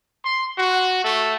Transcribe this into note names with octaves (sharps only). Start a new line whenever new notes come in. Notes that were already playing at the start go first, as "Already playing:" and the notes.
C6
F#4
A3